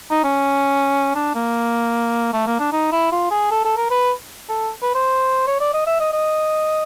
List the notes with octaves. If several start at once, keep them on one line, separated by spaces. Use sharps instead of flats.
D#4
C#4
D4
A#3
A3
A#3
D4
D#4
E4
F4
G#4
A4
A4
A#4
B4
A4
B4
C5
C#5
D5
D#5
E5
D#5
D#5